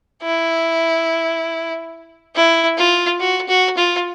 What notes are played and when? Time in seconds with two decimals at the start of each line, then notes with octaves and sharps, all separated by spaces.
0.23 E4
2.36 E4
2.78 F4
3.20 F#4
3.49 F#4
3.77 F4